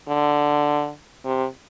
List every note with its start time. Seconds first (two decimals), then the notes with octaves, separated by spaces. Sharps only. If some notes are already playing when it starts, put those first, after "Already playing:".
0.08 D3
1.24 C3